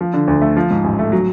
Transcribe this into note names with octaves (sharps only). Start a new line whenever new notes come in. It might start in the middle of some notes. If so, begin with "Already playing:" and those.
F3
D3
D2
A3
F3
G#2
A1
A3
F#3